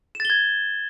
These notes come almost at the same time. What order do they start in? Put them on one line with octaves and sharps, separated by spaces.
E7 A6 G7 G#6